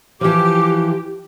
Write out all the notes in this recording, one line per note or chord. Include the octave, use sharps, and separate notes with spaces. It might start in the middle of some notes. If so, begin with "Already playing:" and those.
E3 F3 G4 D6